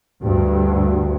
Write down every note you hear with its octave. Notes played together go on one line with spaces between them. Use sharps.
D2 G2